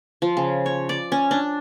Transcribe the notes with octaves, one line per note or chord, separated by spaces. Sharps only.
F3
C#3
C#5
D5
C#4
D4